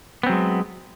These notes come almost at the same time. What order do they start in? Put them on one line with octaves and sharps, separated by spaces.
B3 C4 F#3 G#3